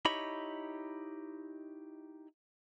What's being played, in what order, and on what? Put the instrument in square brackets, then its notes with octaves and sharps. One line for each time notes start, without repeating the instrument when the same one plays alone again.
[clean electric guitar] D#4 E4 G4 C#5 D#5 B5